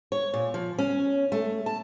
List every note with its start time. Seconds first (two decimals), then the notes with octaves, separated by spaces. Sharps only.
0.12 C#5
0.34 A#2
0.54 F3
0.79 C#4
1.32 A3
1.66 A5